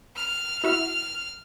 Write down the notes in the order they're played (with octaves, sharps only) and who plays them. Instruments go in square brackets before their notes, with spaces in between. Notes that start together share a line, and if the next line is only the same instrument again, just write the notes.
[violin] F6
[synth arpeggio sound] E4 F#4 E5 [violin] F6